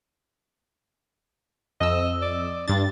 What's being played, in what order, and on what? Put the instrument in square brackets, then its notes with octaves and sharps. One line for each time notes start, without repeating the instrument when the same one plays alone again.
[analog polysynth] F2 E6 [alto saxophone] D#5
[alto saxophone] D5
[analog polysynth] G2 A6 [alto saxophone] D4